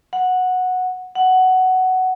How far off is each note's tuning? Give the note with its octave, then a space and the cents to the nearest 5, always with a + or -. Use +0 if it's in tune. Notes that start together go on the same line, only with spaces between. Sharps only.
F#5 -10
F#5 +10